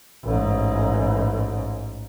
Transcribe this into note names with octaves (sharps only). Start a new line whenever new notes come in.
A1 G#2